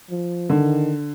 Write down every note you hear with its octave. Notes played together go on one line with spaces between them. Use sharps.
F3
D3 D#3